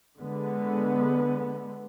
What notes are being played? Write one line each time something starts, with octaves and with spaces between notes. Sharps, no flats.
D3 G#3 B3